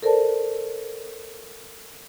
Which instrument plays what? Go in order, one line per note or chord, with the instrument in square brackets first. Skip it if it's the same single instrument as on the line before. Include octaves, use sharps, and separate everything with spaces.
[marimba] A4 A#4 C5 D5 A5